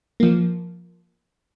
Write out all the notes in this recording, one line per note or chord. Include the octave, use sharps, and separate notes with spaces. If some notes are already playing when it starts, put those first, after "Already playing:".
F3 A#3